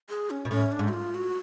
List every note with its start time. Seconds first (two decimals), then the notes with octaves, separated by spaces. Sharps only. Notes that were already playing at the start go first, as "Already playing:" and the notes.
0.10 G#4
0.30 C#4
0.45 B2
0.51 A2 C#4
0.72 D4
0.79 G#2
0.88 F#4
0.93 F4
1.15 F#4